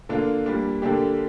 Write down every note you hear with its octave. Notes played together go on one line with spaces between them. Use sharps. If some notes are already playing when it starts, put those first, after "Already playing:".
D3 A#3 D4 F4
A#2 G3 D4
D3 A#3 D4 G4